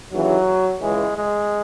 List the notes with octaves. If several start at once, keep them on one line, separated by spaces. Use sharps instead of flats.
D#2 C#3 E3 F#3
C#2 C#3 E3 G#3
G#3